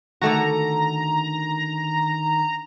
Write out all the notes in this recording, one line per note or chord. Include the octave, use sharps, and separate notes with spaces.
D3 D#3 A3 F#4 A#5